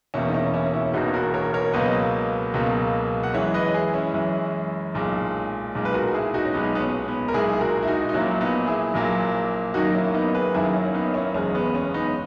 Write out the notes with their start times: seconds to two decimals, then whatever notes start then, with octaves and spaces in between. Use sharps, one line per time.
0.14 E1 E2 B2 A#3 C#4 E4
0.28 D#4
0.34 C#4 E4
0.54 C#4 E4
0.74 C#4 E4
0.93 E1 E2 B2 A#3 D#4 F#4
1.14 F#4 A#4
1.34 A#4 C#5
1.54 A#4 C#5
1.73 C#2 B2 F#3 A#3 B4 D#5
2.54 C#2 B2 F#3 A#3
3.23 F#5
3.34 F#2 E3 G#3 C#5 E5
3.54 B4 D#5
3.74 E4 G#4
3.94 C#4 E4
4.14 F#2 E3 G#3
4.94 B1 A#2 G#3
5.75 B1 A#2 G#3
5.85 B4
5.94 F#4 A#4
6.08 F#4
6.14 E4 G#4
6.34 D#4 F#4
6.45 C#4
6.54 B1 A#2 G#3 B3 D#4
6.75 B3
6.81 C#4
7.08 B3
7.28 A#4
7.34 B1 A#2 G#3 E4 G#4
7.61 F#4 A#4
7.83 E4
7.88 D#4 F#4
8.09 D#4
8.14 A#1 A#2 F#3 A#3 C#4 E4
8.41 B3 D#4
8.67 E4 G#4
8.94 A#1 A#2 F#3 A#3
9.74 F#2 D#3 F#3 A#3 D#4 F#4
9.87 F#4
9.94 C#4 E4
10.14 B3 D#4
10.35 G#4 B4
10.54 F#2 D#3 F#3 A#3 E4 G#4
10.74 C#4
10.85 C#4
10.94 B3 D#4
11.14 C#4 E4
11.34 F#1 E2 C#3 G#3 C#4
11.55 B3
11.75 C#4
11.94 B3 D#4